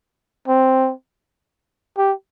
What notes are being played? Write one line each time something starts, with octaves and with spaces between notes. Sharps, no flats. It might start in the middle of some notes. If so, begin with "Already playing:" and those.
C4
G4